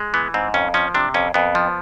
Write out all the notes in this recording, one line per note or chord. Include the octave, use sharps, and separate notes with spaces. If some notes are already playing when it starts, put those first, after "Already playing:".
Already playing: G#3
E3 B3
G#2 C4
F2 C#4
F3 C#4
C3 D4
F2 C#4
F2 B3
F3